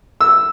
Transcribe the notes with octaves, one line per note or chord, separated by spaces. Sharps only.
E6